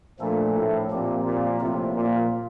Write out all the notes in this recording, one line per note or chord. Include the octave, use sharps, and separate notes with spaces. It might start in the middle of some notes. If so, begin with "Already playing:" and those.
A#2 F3 A3 D4 A4
A2
A#2 F3 C4 G4
A#2
A2 C3 F3 A#3 F4 A#4
A#2